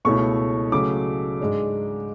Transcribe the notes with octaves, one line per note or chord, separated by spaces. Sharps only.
C#2 B2 A3 C#4 E4 C#6
C#3 F#3 A3 D6
G#2 G#3 D4